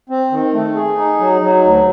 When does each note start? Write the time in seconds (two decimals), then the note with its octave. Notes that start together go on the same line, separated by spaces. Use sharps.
0.10 C4
0.31 D#3
0.53 A3
0.75 G#4
0.97 D#4
1.20 F#3
1.41 F#3
1.64 D2